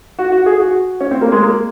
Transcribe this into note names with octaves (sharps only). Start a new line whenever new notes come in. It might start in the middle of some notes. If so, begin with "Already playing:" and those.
F#4
F#4
G#4
F#4
C#4
C4
A#3
G#3
A#3